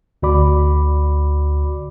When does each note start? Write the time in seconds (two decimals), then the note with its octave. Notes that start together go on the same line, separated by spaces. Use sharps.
0.23 D2 D3 F#4 D5 B5 D6